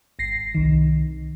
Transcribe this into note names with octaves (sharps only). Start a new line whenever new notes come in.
G#1 A#6 C7
C2 D#3